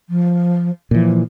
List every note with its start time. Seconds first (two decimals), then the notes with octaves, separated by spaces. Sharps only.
0.09 F3
0.91 A#2 E3 F3